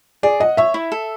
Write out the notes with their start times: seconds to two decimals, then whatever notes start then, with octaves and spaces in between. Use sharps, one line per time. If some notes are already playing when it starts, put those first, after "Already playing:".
0.23 G#4 D5
0.40 D#5 F#5
0.57 C#5 E5
0.74 E4
0.92 A4